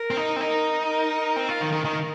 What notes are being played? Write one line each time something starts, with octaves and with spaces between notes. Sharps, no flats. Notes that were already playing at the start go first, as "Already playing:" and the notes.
Already playing: A#4
C4
D#4
C4
D#4 A#4
A#4
C4
F4
D#3
D#3
D#3 A#4